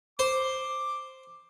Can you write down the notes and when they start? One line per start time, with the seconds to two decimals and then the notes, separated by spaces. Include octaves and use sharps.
0.19 C5 D6